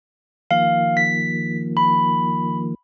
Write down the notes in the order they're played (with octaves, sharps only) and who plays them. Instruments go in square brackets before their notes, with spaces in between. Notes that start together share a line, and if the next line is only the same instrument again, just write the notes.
[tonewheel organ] D#3 F3 A#3 [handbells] F5
[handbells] B6
B5